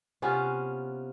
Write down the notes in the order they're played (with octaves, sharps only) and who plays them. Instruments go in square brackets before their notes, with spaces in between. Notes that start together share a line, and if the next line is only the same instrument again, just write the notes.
[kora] C3 B3 C#4 F4